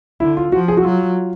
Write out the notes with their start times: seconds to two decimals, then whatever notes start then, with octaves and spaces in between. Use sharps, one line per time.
0.20 D3 E4
0.37 F4
0.52 F3 F#4
0.68 G#4
0.77 F#4
0.85 F#3 F4